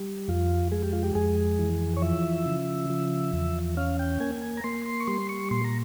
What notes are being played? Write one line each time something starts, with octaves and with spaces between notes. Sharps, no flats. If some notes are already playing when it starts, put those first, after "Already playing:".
Already playing: G3
F2 F4
G#3 G#4
G4
F4
G4
F2 G#4
E3
C#5
F3 E5
C#3
F3
E2
C#4 F5
G5
A#3 G#5
G#5
A#5
A#3 C6
C6
C#6
G3 C6
C#6
A#2 C6
A#5